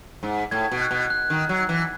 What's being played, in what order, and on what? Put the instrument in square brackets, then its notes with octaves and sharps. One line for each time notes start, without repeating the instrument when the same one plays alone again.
[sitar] G#2
[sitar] A2 [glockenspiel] G#6
[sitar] B2
[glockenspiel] F#6
[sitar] B2
[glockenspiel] F#6
[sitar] D#3
F#3
E3